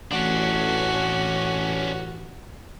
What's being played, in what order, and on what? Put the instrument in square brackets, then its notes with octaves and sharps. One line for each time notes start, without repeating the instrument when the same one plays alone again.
[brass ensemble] A1 [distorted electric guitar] C#4 D4 [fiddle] F#4